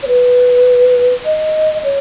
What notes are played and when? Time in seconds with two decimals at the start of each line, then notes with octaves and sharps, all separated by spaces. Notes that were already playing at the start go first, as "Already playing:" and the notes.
0.03 C#5
0.08 B4
1.25 D#5
1.84 C#5